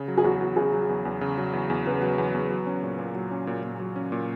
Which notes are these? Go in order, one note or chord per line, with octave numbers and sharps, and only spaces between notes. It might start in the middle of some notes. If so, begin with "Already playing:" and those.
Already playing: C#3
F#3
G#4
E2 F#4
E2
C#3 G#4
F#3
E2
E2
C#3
F#3
E2
E2
C#3 B3
F#3
E2
E2
F#3
C#4
A#2
A#2
F#3
C#4
A#2
A#2
F#3
C#4
A#2